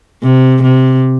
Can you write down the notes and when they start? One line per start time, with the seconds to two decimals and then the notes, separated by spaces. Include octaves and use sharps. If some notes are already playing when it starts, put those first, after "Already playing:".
0.23 C3
0.63 C3